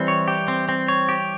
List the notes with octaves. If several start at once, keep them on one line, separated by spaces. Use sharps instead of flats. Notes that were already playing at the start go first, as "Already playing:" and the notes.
Already playing: E3 G3 C4
C#5
G4
C4
C4
C#5
G4